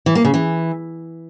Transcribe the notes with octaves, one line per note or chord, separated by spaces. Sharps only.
E3
A#3
C#3
E3